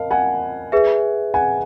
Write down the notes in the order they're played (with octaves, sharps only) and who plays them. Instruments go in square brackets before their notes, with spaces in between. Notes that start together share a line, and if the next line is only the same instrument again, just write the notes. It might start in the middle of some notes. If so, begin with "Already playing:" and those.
Already playing: [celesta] A#4 D#5 A5 [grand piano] F5
[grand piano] F#5 G#5
[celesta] G#4 B4 E5
[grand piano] F#5 G#5